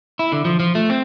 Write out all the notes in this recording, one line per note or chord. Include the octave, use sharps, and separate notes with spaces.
E4
D3
F3
F3
A3
C4